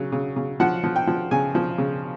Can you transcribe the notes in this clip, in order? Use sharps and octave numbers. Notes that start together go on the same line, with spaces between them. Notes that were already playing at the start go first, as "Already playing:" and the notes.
Already playing: C#3 F#3
C#3
C#3
F3 F#5
F3
G5
F3
C#3 G#5
F3
C#3